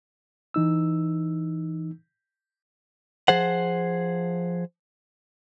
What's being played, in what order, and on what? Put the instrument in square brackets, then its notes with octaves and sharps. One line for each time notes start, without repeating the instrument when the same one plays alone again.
[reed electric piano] E3 D#4 E6
[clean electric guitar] F3 G#4 C5 F#5